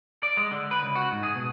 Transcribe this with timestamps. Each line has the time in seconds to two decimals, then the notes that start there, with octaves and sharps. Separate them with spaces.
0.23 D5
0.37 G#3
0.51 D3
0.71 B4
0.83 C#2
0.95 F#4
1.11 G#2
1.23 G#4
1.35 B2